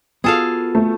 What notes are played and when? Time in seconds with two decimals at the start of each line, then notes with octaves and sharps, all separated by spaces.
0.24 B3 F4 F#4 G#4 A4 F5
0.75 A3